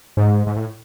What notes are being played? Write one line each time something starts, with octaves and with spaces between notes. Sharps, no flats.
G#2
G#2
A2